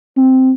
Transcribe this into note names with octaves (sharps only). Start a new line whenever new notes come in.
C4